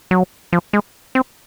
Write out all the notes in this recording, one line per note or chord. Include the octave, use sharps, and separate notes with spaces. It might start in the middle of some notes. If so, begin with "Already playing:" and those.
F#3
F3
G#3
C4